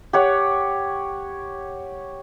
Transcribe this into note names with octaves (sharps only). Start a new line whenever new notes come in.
G4 C#5 F#5